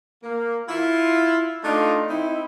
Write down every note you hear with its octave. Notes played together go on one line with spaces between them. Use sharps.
A#3
E4 F4
A3 D4 D#4 F4
C4 D#4 E4